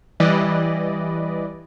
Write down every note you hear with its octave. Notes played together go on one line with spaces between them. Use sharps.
E3 G3 B4 D5 D#5